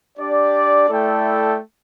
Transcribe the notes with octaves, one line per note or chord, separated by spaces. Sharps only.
D4 G4 D5
A3 E4 A4 D5 G5